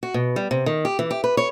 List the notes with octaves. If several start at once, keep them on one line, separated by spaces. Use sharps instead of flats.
F#4
B2
G3
C3
D#3
G4
E3
G4
B4
C#5